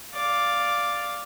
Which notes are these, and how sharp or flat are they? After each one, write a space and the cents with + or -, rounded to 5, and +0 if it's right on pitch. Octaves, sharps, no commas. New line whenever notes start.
D5 +0 F5 +0